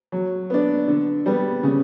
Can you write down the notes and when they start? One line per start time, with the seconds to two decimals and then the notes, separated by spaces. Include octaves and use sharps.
0.12 F#3
0.50 B3 D4
0.88 D3
1.26 G3 B3
1.63 C#3